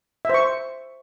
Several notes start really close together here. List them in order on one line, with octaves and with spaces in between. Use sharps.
E5 C5 C#6